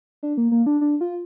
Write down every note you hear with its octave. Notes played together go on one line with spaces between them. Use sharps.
D4
A#3
A#3
D4
D4
F4